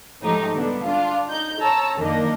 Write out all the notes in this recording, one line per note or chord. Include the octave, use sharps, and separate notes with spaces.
G#2 F3 F#3 A3 D#4 G4
D3 G3 A3 B3 D4
D4 F4
D#4 G6
C#5 A5 A#5 E6
F#2 D#3 A#3 D4 D#4 D#5